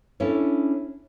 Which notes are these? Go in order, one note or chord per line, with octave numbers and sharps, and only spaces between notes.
C#4 D4 E4 A4 C#5